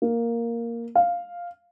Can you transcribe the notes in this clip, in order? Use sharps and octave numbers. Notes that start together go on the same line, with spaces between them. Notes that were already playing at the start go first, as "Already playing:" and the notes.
A#3
F5